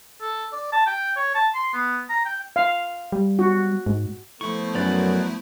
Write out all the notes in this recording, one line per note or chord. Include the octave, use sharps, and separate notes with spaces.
A4
D5
A5
G5
C#5
A5
C6
B3
A#5
G5
F5
G3
F#4
G#2
F3 A3 B3 E4 A4 C5 C#6
F#2 F#3 B4 D5